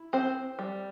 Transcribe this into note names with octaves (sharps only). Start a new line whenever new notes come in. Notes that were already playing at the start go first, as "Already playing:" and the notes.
Already playing: E4
C4 C5
G3